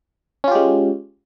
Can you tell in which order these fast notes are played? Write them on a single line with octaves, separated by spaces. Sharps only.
C#4 F4 G4 G#3